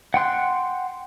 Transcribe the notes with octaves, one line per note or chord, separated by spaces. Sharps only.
F#5 G5 C6 F#6